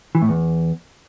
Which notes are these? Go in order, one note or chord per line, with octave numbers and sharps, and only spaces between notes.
E3
A2
E2